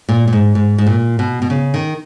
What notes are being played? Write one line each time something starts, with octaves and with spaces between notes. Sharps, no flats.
A#2
A#2
G#2
G#2
G#2
A#2
B2
B2
C#3
D#3